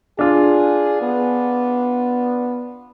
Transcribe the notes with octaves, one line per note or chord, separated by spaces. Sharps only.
D4 F4 G#4
B3